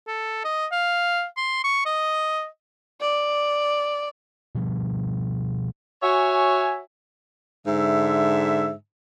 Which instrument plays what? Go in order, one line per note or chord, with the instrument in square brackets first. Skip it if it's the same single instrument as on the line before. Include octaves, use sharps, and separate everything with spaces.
[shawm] A4
D#5
F5
C6
C#6
D#5
[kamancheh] D5
[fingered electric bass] B2 F3 G3
[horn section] F#4 C#5 E5 G#5
G#2 D3 E5